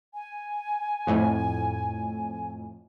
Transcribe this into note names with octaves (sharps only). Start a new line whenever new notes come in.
G#5
F2 A2